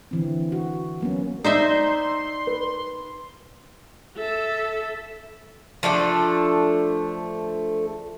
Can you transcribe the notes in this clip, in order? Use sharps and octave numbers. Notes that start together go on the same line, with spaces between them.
D3 E3 C4
F#4
F#3 A#3 B3 C#4
D#4 C5 D5 E5 C6
B4
A4 E5
F3 A3 D4 A4